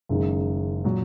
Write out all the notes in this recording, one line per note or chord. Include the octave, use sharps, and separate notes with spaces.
F#1 F#2 D#3 G#3 D#4
A#2 F#3